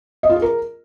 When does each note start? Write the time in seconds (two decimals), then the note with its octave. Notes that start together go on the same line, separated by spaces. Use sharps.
0.23 D#5
0.30 F4
0.36 G#4
0.42 A#4